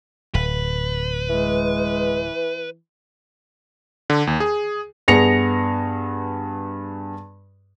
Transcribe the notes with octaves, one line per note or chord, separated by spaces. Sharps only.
D1 B4
E3 G#3
D3
D#2
G#4
G2 B3 G#4 A#6 C#7 F7